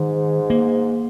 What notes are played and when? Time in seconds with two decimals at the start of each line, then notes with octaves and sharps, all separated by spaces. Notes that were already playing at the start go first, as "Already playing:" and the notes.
Already playing: G#2 D#3
0.50 A#3